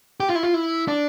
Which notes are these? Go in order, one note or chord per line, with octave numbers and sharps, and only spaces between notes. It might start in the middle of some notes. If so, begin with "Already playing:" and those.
G4
F4
E4
F4
E4
D4